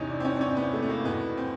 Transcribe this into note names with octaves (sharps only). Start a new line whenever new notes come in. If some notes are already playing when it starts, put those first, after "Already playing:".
Already playing: E2 C3 E3 C#4 D#4
D4
C4
C#4
D4
C#4
B3
A3
B3
A#3
E2 B2 B3
C4